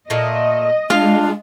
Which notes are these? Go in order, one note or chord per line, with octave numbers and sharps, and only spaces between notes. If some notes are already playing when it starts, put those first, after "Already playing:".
A#2 A3 D#5
G#3 D4 F4 F5